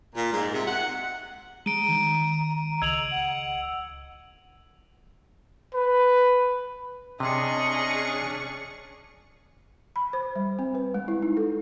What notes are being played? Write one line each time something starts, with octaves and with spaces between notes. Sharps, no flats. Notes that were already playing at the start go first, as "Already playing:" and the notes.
A#2
G#2
C3
F#5
G#3 A#5 D7 D#7
D#3
C#2 D#5 E6 G#6 F7 F#7
F#5
B4
C3 C#4 D4 G#4 D#5 C#6
B5
C5
G3
C4
B4
G#3
E4
D#4
A4